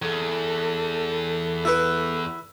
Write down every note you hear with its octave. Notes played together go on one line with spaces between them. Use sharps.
E2 A4
E4 B4